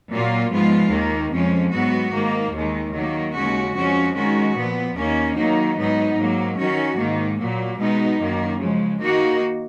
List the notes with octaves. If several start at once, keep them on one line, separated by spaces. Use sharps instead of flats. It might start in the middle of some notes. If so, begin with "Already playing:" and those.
A#2 F#3 A#3 F4
G#2 F3 G#3 B3 F4
D#2 D#3 A#3
F2 F3 G#3 C#4
G#2 F#3 B3 F#4
G#2 D#3 A#3
D#2 D#3 G#3
D#3 F#3 A#3
D#2 C#3 G#3 C#4 F#4
F2 F3 G#3 C#4 F#4
D#3 G#3 C#4 F#4
A#2 F3 B3
D#2 D#3 A#3 C#4
D#3 F#3 A#3 D#4
G#2 F#3 B3 D#4
G#2 F#3 A#3
D#3 F#3 C#4 F#4
G#2 D#3 A#3
A#2 F#3 A#3
B2 G#3 B3 D#4
F#2 D#3 A#3
C#3 F3 G#3
D#3 A#3 D#4 F#4